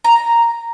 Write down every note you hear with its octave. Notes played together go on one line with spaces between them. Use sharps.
A#5